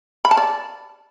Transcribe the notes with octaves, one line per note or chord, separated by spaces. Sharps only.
B5
A5
D5